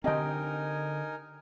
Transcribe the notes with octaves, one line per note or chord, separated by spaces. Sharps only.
D3 C4 D#4 G4 A#4 D#5 G5 G#5